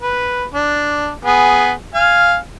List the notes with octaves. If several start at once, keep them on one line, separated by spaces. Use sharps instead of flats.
B4
D4
B3 G#4
F5 G#5 F6